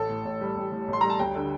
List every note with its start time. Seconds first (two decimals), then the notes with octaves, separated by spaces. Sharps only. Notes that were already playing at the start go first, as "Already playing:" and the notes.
Already playing: A1 A4
0.09 A2
0.25 A1
0.41 G3
0.56 A1
0.72 A2
0.88 A1 C6
1.01 G3 A#5
1.10 A5
1.19 D2 G5
1.35 D3